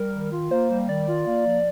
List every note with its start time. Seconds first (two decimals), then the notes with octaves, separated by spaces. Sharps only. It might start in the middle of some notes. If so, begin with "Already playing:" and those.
Already playing: G3 A#4
0.13 D#3
0.32 F4
0.51 A#3 C5
0.70 G3
0.89 D#3 D5
1.08 F4
1.26 A#3
1.46 F3